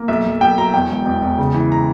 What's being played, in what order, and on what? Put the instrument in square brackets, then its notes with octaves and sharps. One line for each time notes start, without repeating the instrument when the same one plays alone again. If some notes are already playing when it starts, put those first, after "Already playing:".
Already playing: [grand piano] A#3
B1 E5
B1
B1 G5
F#3 A#5
E2 G5
E1
E2
E2
C#3
E3
A#5